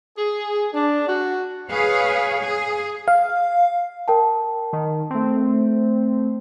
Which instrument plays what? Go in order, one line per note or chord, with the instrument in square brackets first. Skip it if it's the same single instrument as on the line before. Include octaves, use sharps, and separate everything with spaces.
[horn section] G#4
D4
F#4
[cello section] G#4 B4 C#5 F5
G#4
[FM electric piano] F5
[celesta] A#4 G5 A5
[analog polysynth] D#3
A3 C4